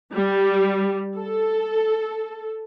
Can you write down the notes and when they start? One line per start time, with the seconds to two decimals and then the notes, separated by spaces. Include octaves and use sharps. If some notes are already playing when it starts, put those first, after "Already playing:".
0.15 G3
1.16 A4